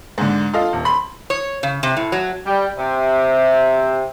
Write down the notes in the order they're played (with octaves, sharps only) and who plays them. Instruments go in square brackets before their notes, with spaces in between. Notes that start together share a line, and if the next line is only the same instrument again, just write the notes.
[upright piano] G#2 D3
F4 A4 D#5 F5
D#1
B5 C6
[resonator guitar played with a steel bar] C#5
C#3
C3
A2
F#3
[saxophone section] G3
C3